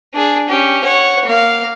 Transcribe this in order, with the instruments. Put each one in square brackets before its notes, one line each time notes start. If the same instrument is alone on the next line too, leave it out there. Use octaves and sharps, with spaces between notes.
[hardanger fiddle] D4 G#4
C#4 G4
C#5 F#5
A#3 F5